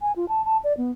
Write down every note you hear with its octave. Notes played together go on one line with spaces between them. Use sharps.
G#5
F4
A5
A5
D5
B3